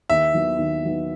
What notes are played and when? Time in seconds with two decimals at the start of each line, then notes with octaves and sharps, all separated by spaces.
0.10 D#2 E5
0.34 D#3 F#3 B3 E4
0.58 D#2
0.83 D#3 F#3 B3 E4